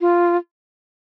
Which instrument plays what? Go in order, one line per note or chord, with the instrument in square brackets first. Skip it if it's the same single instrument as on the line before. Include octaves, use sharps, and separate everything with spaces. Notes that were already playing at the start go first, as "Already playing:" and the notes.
[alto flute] F4